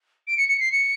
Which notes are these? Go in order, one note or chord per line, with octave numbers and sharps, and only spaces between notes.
D7
C#7
C#7
C7
C#7